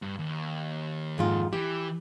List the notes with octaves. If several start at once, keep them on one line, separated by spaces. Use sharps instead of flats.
G2
D#2
F2 G#2 F4
E3 G4